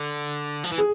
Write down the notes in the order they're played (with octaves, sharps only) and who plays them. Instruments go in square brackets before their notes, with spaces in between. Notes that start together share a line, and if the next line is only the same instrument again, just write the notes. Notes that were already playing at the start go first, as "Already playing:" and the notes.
Already playing: [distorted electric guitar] D3
F3
E3
[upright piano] G#4